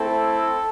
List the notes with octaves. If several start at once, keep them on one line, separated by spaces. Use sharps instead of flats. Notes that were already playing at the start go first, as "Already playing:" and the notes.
Already playing: A3 C4 E4 A4